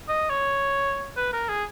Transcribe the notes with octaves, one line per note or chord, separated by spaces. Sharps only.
D#5
C#5
B4
A#4
G#4